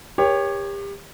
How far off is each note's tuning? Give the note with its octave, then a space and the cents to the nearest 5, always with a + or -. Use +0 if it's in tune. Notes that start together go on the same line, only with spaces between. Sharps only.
G4 +30 A#4 +40 C#5 +0